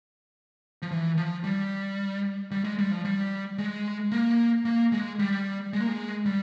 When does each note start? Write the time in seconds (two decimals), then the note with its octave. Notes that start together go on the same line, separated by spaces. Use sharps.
0.82 F3
0.91 E3
1.17 F3
1.44 G3
2.51 G3
2.64 G#3
2.78 G3
2.91 F3
3.05 G3
3.58 G#3
4.12 A#3
4.65 A#3
4.92 G#3
5.19 G3
5.73 G#3
5.80 A#3
5.87 G#3
6.25 G3